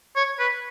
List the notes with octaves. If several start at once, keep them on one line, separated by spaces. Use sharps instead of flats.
C#5
B4